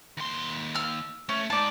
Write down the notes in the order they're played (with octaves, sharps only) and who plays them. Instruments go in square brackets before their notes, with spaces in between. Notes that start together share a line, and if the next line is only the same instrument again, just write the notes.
[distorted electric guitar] D#2 C6
[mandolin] E6 F6
[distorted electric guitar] A3 [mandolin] C#4
[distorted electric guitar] G#3 D#4 [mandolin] D5 A5